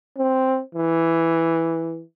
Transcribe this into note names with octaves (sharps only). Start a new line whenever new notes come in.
C4
E3